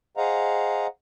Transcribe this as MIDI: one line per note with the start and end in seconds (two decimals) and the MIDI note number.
0.17 0.87 68
0.17 0.87 72
0.17 0.87 75
0.17 0.87 77
0.17 0.87 78
0.17 0.87 82